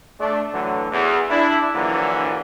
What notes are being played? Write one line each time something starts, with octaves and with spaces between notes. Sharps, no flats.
A3 D4
A2 D3 E3 F#3
E2
D4 E4
A#1 D3 E3 F#3 A#3